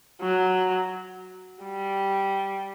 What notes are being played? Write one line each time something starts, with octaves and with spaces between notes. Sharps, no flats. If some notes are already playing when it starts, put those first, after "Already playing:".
F#3
G3